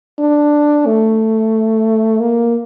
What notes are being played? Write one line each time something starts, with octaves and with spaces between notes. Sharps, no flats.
D4
A3
A#3